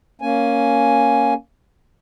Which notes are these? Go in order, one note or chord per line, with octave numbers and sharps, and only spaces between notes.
A#3 C#4 G#5